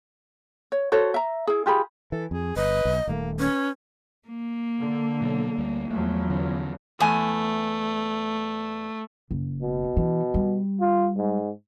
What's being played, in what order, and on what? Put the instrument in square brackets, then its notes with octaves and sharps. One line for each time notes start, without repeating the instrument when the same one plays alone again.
[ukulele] C#5
F#4 A4 C5 C#5
E5 A#5
E4 G#4
F4 G4 G#4 B5
[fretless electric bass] E3 [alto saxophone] A4
[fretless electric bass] F2 [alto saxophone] G#4
[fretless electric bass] G1 [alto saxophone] B4 [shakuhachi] D#5
[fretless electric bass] B1
[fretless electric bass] D#1 D#2 A3 [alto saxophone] A#3
[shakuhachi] C#4 [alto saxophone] B4
[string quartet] A#3
[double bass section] D3
[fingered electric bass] B2 F#3
D2 G3
[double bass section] E2 F3 F#3 [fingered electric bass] A3
[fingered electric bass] D3 C#4
[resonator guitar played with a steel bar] E2 G#5 [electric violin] A3
[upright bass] F#1
[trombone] B2
[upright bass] E3
G3
[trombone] F4
G#2